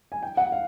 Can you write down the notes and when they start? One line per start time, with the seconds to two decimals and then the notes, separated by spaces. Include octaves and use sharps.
0.12 G#5
0.23 G5
0.37 F#5
0.52 F5